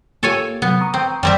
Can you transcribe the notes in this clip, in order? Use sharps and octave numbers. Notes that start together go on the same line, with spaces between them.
A#3 F4 G4 A4 C#5 G#5
C3 F#3 B3
A#5 C#6 D#6
C4
F#2 G3 C4 D5 E5